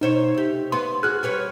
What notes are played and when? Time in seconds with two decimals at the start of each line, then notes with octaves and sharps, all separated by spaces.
0.01 B2 D#4 C5 C#5
0.34 C3 G4
0.72 B3 C6
1.03 F#4 G#4 F6 F#6
1.23 G3 B4 C#5